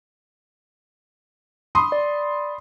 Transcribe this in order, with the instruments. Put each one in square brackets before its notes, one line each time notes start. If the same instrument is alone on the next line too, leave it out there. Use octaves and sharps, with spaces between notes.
[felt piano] B5 C6 D#6
[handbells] D5